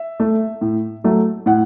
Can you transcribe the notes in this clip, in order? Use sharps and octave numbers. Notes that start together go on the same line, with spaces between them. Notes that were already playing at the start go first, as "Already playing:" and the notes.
Already playing: E5
A3
A2
F#3 A3
A2 F#5